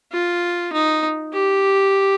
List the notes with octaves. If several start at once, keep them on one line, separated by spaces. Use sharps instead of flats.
F4
D#4
G4